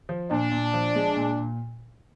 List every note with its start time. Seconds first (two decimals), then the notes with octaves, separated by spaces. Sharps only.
0.09 F3
0.31 A#2 D4
0.52 A#2
0.74 F3
0.95 G#3
1.16 A#2
1.38 A#2